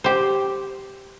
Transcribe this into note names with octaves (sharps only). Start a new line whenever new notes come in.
G4 C5